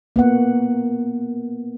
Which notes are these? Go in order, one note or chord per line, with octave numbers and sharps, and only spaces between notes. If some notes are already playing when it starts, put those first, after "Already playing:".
A#3 B3 F#5